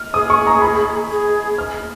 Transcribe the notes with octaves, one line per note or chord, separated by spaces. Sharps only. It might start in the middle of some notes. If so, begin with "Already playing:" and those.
Already playing: F6
G#4 D#6
C#6
A#5
B5
G#4
F6